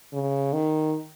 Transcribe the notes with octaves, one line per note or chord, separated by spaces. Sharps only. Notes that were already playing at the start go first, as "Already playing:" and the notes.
C#3
D#3